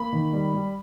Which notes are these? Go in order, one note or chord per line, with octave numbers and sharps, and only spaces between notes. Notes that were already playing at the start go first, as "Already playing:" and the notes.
Already playing: A#3 B5
D#3
G3
G3